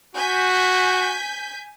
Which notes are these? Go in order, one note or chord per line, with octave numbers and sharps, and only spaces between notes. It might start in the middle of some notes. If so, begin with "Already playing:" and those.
F#4 G#5 G6 B6